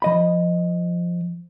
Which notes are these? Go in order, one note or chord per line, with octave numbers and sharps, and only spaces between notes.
F3 D#5 B5